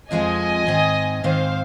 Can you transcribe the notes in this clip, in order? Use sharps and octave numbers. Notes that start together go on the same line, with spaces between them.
F2 F3 G#3 C4 D#5 G#5
G#2 D#3 C4
G#2 D#3 C4 C5 F5